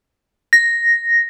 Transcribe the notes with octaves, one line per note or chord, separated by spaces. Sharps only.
A#6